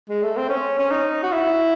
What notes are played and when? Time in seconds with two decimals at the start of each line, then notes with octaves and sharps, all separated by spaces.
0.09 G#3
0.23 A3
0.37 C4
0.49 C#4
0.79 C#4
0.91 D#4
1.23 F#4
1.32 E4